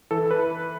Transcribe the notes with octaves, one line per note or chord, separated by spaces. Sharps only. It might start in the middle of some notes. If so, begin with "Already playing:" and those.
E3 A4
B4